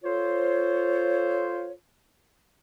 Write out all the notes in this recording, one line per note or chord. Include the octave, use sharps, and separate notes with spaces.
F4 A4 C5 C#5